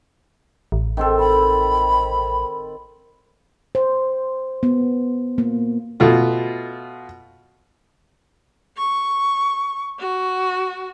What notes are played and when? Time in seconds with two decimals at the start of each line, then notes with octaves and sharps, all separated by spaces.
0.72 A1
0.97 D#3 C4 A4
1.19 B5
3.75 C5
4.63 B3
5.38 A#3
6.00 B2 A3 F4
8.77 C#6
9.99 F#4